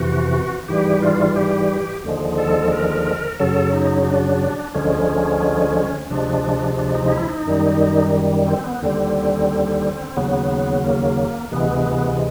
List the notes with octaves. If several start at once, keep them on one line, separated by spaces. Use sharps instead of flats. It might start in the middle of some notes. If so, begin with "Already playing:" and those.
Already playing: F2 C3 E3 F#4
G#2 E3 G3 G4
F4
G4
D#2 D3 F3 G#3
A4
A#4
F#2 C#3 F#3 A4
D#4
D#4
D4
D2 D3 F3 G#3 C#4
D2 C3 F3 G#3 D4
D4
D#4
D#4
E4
D#4
F#2 D#3 G3
C4
B3
D#2 D3 G3 C4
C4
D#2 C#3 F#3 B3
A#3
D2 C3 E3 G#3 B3